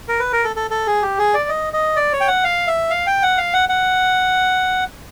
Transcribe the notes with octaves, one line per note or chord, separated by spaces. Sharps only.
A#4
B4
A#4
A4
A4
A4
G#4
G4
G#4
D5
D#5
D#5
D5
C#5
G5
F#5
F5
E5
F5
G5
F#5
F5
F#5
F#5